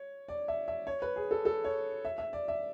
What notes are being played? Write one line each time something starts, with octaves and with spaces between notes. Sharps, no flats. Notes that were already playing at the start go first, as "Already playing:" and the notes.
Already playing: C#5
D5
E5
E5
C#5
B4
G#4
A4
A4
C#5
E5
E5
D5
E5